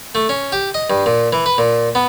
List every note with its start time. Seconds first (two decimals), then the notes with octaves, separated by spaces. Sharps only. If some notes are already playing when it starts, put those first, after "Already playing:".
0.15 A3
0.29 C#4
0.52 G4
0.74 D#5
0.90 G2
1.06 A#2
1.33 E3
1.46 B4
1.58 A#2
1.95 B3